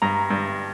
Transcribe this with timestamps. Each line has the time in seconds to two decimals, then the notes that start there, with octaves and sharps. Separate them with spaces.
0.02 G2 A#5
0.30 G2